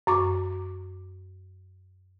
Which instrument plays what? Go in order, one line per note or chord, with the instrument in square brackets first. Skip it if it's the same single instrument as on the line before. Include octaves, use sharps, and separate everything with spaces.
[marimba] F#2 C#6 D6